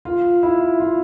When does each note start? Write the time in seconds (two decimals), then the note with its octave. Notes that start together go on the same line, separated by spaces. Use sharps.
0.05 F4
0.43 E4
0.80 F4